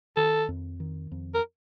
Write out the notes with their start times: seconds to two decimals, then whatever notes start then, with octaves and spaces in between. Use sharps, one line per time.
0.17 D#3 A4
0.48 F2
0.80 D#3
1.12 F2
1.34 A#4